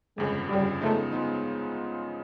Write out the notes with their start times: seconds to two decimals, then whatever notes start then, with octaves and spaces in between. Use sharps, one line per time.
0.17 G1 F2 C#3 G#3
0.49 G1 F2 C#3 G3
0.81 C#3 F3 G#3 A3 B3 D#4
1.12 F3 G#3 B3 D#4